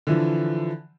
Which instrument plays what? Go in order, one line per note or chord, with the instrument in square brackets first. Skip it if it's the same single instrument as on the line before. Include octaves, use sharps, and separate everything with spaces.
[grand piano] D3 E3 F3